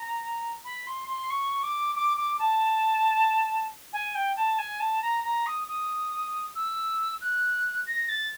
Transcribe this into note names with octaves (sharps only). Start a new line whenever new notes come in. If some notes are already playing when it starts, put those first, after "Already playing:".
Already playing: A#5
B5
C6
C6
C#6
D6
D6
D6
A5
G#5
G5
A5
G#5
A5
A#5
A#5
D#6
D#6
E6
F#6
A#6
A6